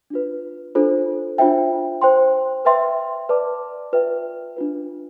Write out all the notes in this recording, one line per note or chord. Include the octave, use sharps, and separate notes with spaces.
D4 F4 B4
D4 F4 A4 C5
D4 F4 C5 E5 G5
C5 G5 C6
B4 E5 G5 C6
B4 D5 A5 D6
F4 B4 E5 G5
D4 F4 B4